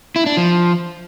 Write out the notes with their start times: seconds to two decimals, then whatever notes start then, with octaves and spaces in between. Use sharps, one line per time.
0.16 E4
0.26 D4
0.37 F3